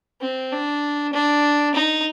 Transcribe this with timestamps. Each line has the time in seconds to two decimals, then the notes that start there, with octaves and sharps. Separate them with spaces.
0.21 C4
0.52 D4
1.13 D4
1.75 D#4